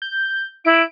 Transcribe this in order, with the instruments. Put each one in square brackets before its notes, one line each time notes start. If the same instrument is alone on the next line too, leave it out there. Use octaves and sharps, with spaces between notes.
[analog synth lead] G6
[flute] E4 [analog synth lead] D7